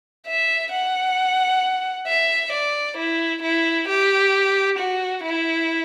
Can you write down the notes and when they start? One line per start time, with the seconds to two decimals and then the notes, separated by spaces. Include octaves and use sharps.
0.27 E5
0.73 F#5
2.08 E5
2.53 D5
2.98 E4
3.43 E4
3.89 G4
4.79 F#4
5.23 E4